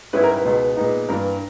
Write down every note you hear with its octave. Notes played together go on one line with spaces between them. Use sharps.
G#2 G3 C#4 E4 B4
A#4
B4
C#2 B2 G#3 D#4
A#2 G#3 B3 D#4
G2 E3 A#3 A#4